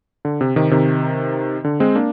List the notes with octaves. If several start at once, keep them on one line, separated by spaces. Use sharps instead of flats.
D3
C3
C3 D#3
C3 D#3
D3
G#3 C4
A#3 D4